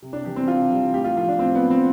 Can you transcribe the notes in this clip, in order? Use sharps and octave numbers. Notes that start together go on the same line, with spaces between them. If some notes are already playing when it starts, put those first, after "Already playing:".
C3
D4
E3 G3 G4
C4
C3 F4
E3 G3
A2 G4
F4
F3 F4
D4
A2 C4
B3
F3
C4